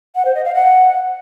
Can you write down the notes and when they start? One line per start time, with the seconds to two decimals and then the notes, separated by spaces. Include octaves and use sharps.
0.15 F#5
0.25 C5
0.35 D#5
0.45 F5
0.55 F#5